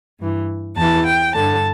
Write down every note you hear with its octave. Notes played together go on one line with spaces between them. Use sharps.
G2 E3
E2 E3 A5
G5
G2 D3 A5